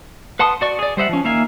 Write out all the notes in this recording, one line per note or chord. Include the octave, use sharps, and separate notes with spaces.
B4 F#5 A5 C6 D#6
F#4 D5 C#6
G#4 D5
G3 C5 E5 F#5
F3 C#4
D#3 A#3 E5 F5 G#5